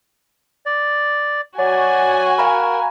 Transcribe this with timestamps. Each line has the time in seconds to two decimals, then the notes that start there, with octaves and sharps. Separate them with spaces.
0.66 D5
1.58 F#3 F#4 D5 G#5
2.38 A#4 F5 A#5 B5